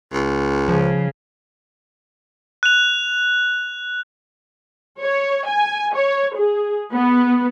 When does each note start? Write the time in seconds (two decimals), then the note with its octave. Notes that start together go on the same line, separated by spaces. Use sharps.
0.12 C#2
0.68 C#3 F3
2.63 F#6 F7
5.01 C#5
5.47 G#5
5.96 C#5
6.36 G#4
6.93 B3